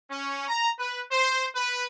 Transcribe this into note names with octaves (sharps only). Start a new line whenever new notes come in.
C#4
A#5
B4
C5
B4